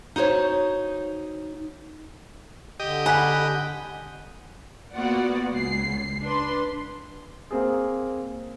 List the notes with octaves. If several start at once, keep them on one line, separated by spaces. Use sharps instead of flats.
D#4 F#4 C5 C#5
D3 G4 D#5
F#5 G#5 B5
A#3 B3 F4 F#4 D5 F#5
C#2 C7
D4 B4 C6
A#3 C4 G#4